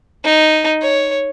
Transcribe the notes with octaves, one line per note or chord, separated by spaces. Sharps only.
D#4
C#5